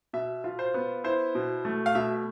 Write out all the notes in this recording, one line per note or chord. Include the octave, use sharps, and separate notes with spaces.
B2 E5
F4
C5
B3
E4 C5
B2
A3
F5
B2 E5